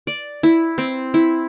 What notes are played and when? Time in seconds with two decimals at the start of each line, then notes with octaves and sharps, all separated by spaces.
0.07 D5
0.43 E4
0.78 C4
1.14 E4